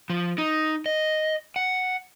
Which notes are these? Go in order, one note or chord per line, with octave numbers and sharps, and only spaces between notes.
F3
D#4
D#5
F#5